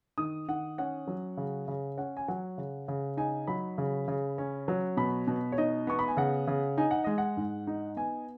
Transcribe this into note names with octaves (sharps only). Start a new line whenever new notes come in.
D#3 D#6
D#3 F#5
C#4 F#5
F#3
C#3
C#3
C#4 F#5
G#5
F#3 F#5
C#3
C#3
D#4 G#5
F#3 B5
C#3
C#3
C#4
F#3
B2 B5
B2
C#5
D#4 D#5
B3 C#6
B5
G#5
C#3 F#5
C#3
D#4 G#5
F#5
G#3 D#5
F#5
G#2
D#4
B3 G#5